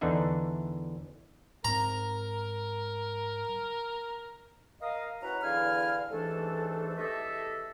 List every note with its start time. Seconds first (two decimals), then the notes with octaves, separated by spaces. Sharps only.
0.01 E2 D3 E3 D4 D#4 E5
1.65 G#2 C4 A#4 A#5
4.81 A#4 D#5 F5
5.22 C#4 E4 F#4 B4 F#5 A#5
5.42 E2 D3 E4 F5 G#5 F6
6.10 C2 G#2 E3 A3 D4 A4
6.97 E2 A3 G4 A4 D#5 E5